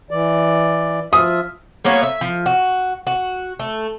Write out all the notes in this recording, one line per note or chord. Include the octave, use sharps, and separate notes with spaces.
E3 D5
F3 F4 E5 D#6
G3 A#3 B3 C#5
E5
F3
F#4
F#4
A3